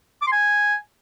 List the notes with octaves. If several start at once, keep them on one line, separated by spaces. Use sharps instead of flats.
D6
C6
G#5